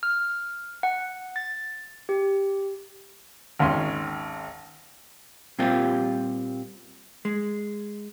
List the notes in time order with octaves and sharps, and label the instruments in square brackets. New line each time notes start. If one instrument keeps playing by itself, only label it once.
[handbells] F6
F#5
A6
G4
[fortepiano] G#1 D#2 C#4 C6
[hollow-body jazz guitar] A#2 G3 C4 F4 G4
G#3